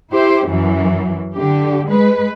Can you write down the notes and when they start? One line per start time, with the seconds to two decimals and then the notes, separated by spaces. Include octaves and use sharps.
0.12 E4 G4 C5
0.46 F#2 E3 F#3
1.35 D3 G4
1.86 G#3 B4